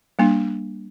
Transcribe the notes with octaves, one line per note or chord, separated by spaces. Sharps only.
G3 A#3 D4